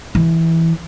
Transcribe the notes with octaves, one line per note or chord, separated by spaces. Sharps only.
E3